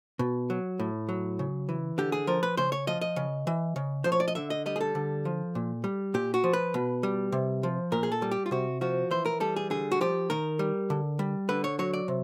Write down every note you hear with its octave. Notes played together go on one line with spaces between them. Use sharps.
B2
F#3
A2
F#3
C#3
E3
D3 G4
G#4
F3 A#4
B4
C#3 C5
C#5
F3 D#5
D#5
C#3
E3
C#3
F3 C5
C#5
D5
D#5
D3 E5
D#5
G3 D#5
G#4
A4
D3
F3
A#2
G3
A#2 G4
F#4
F3
B4
B2
G3
C3
F3
A#2 A#4
G#4
A4
G3
G4
F4
C3 F#4
F3 F#4
E3 C5
A#4
G3 A4
G#4
D3 G#4
F#4
F3 G4
D#3 A#4
G3
D3
G3
D3 B4
C#5
F#3 C#5
D5
C3